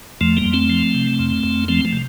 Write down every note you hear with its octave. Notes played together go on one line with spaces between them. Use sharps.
F2 F3 A3
G3 A#3
F2
A3 C4
F3
C3
F2
F2
F3 A3 C4
F3 A3
C3